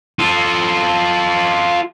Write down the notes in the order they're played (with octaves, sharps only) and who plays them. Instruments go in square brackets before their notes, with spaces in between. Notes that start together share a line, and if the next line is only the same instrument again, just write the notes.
[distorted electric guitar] F4 A4